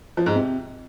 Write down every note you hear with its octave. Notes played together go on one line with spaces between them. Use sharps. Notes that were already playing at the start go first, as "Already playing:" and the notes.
F3
G#2
C3